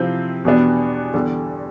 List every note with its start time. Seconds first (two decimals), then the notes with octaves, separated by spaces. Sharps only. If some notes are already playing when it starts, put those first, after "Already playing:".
Already playing: C3 F3 C4 E4 G6
0.45 E2 B2 G3 B3 D4
1.14 E2 D3 G3